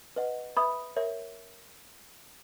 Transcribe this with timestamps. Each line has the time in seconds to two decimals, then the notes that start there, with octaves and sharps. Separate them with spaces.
0.16 B4 D#5 F#5
0.57 B4 E5 B5 D#6
0.97 A#4 C#5 E5